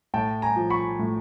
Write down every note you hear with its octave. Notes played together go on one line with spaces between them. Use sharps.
A2 G5 A5
G#5 A#5
F3
B5 C#6
A2